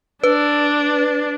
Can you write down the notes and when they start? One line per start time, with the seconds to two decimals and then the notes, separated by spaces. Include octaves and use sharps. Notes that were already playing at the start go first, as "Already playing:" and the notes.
0.24 D4 B4